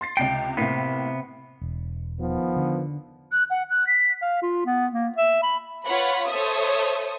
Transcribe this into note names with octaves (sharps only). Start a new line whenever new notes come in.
C6 A6 C7
C#2 C3 G5 C7
A2 C3 A#3 B3 C7
E1
D#3 F3 B3
D3
F#6
F#5
F#6
B6
F5
F4
B3
A#3
E5
B5
F4 B4 C#5 F#5 B5
A4 C5 C#5 E5 D#6